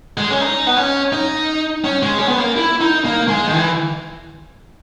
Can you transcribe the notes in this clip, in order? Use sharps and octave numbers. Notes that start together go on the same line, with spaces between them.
G#3
C#4
D#4
B3
C#4
D#4
C#4
G#3
C#4
B3
A#3
E4
D#4
A#3
G#3
D#3
E3